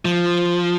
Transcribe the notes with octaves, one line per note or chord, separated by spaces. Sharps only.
F3